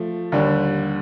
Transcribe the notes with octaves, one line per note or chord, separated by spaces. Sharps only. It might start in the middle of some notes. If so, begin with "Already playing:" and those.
Already playing: F3 A3
D#2 D3 G3